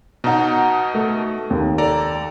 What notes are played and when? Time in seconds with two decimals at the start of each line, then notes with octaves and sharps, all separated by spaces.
0.24 B2 D#4 F#5 A#5
0.94 A3
1.50 D#2
1.78 A4 D5 A#5